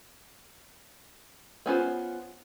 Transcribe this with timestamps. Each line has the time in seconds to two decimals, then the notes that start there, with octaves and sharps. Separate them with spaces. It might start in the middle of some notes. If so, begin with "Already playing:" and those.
1.66 B3 C#4 F4 C5